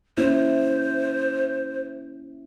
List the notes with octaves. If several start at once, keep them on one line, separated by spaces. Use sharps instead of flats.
A#3 C#4 E4 C5